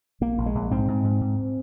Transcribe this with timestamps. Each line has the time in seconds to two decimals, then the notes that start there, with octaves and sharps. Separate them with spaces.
0.21 A#1 A#3
0.38 A#1
0.46 G#3
0.55 A#1
0.71 G#2 C4
0.88 G#2
1.04 G#2
1.21 G#2